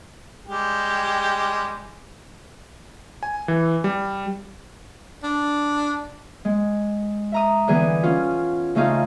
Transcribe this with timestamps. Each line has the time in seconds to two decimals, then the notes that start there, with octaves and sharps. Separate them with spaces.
0.46 G3 G#3 G4
3.23 G#5
3.48 E3
3.84 G3
5.23 D4
6.45 G#3
7.32 E5 A#5 D#6
7.67 D3 E3 G3 B3 G#4
8.03 C#4 F4
8.75 C#3 A3 D#4 F4 G#4